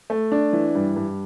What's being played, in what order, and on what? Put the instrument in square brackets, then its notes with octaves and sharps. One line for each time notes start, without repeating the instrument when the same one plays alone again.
[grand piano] A3
D4
E3
G2
G2